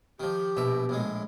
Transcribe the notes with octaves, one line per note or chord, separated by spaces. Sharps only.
D#3 F3 G4
A#1 B2 E5
A#1 A2 G#3